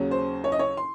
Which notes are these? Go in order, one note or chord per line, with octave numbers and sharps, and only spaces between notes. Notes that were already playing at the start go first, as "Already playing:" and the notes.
Already playing: D#2 C#3 F#3 C#4
C5
C#5
D#5
C#5
C6